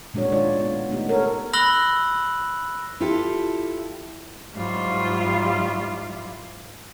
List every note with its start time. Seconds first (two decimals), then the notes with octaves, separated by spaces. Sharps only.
0.14 A#2 G#3 D4 F#4 C#5
0.32 D#4 F4 C#5 D5
0.60 B3
0.90 A3 B3 D#4 G4
1.09 A4 A#4 C#5
1.53 B5 E6 F#6 A#6 F#7 G7
3.00 E4 F4 G4 A4
4.54 G#2 F#3 G3 E4 F4